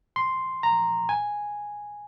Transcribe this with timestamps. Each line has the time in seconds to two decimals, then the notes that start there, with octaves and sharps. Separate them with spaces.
0.16 C6
0.63 A#5
1.09 G#5